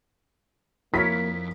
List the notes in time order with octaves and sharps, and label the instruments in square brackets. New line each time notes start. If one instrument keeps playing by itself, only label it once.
[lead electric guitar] F2 [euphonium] A#3 [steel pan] E4 A#4 C#5 [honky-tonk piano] B6